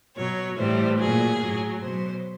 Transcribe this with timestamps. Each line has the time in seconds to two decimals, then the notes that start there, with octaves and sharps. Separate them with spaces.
0.16 B2 F#3 C#5
0.57 A2 E3 G3 C5
0.98 A#2 F#3 G#4
1.40 A2 F#3
1.81 B2 F#3 C5